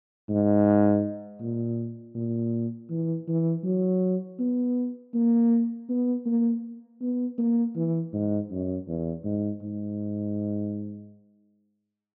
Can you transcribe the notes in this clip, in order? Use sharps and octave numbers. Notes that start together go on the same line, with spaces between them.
G#2
A#2
A#2
E3
E3
F#3
B3
A#3
B3
A#3
B3
A#3
E3
G#2
F#2
E2
G#2
G#2